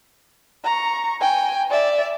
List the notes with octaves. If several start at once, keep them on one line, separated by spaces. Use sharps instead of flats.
A#5 C#6
G5 G#5
D5 E5